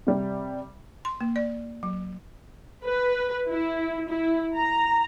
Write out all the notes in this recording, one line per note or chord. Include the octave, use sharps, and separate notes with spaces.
C3 G3
C6
A#3
D5
F#3
B4
E4
E4
A#5